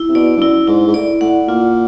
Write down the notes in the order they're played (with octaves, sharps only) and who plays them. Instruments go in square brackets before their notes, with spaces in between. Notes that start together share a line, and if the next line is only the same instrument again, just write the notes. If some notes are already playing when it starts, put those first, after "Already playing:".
Already playing: [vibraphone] E4
[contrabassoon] C3
[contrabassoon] B2 [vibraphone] D5
[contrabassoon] G2
[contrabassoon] F#2 [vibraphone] E4
[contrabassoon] G#2 [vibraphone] E4
[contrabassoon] G#2
[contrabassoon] A2 [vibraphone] D5
[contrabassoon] A2 [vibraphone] F#5
[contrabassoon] A#2 [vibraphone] F4